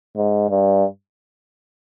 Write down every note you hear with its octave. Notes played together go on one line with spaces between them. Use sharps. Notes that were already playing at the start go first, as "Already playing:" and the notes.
G#2
G2